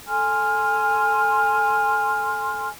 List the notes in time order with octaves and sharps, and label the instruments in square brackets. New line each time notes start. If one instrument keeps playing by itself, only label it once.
[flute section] A4 G#5 C6 F6